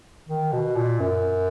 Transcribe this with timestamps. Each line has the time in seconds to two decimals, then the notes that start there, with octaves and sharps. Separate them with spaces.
0.29 D#3
0.52 B2
0.76 A#2
1.00 F#2